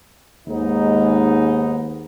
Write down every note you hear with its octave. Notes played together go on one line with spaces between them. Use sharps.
D#2 G#2 G#3 B3 D#4